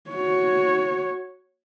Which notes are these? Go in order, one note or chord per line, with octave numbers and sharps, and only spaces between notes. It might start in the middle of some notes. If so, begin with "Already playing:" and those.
F#4 C#5